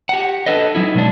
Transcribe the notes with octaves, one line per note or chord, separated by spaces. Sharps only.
G4 F#5
D4 A4 B4 D#5
F#3 D#4 E4
B2 G#3 D4